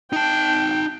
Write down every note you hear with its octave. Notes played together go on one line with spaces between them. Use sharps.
D#4 G5 A5